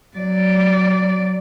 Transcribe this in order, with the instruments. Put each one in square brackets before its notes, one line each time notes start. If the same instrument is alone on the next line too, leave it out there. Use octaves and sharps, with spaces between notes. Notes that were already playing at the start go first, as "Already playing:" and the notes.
[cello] F#3 D5